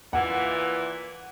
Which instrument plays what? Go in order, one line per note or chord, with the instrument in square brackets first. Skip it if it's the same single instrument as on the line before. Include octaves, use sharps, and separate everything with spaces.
[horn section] A#2 E3 [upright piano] F#5